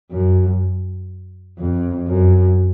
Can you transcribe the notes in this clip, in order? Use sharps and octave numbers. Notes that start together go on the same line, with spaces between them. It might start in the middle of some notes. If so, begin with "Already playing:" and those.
F#2
F2
F#2